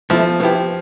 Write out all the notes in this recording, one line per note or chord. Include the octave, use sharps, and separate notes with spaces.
B2 F3 A3 E4
B2 B3 E4 G4